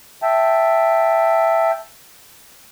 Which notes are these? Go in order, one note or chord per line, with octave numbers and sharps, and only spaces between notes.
E5 G5 A5